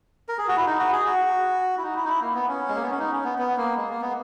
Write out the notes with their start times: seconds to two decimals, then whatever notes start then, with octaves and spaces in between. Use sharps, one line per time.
0.29 A#4
0.38 G#4
0.48 F#4
0.57 E4
0.66 D#4
0.79 F#4
0.92 G#4
1.06 F#4
1.78 E4
1.83 D#4
1.96 E4
2.04 D#4
2.09 E4
2.22 A#3
2.34 B3
2.48 C#4
2.68 G#3
2.75 A#3
2.83 B3
2.91 C#4
2.99 D#4
3.12 C#4
3.24 B3
3.38 B3
3.58 A#3
3.77 G#3
3.90 A#3
4.02 B3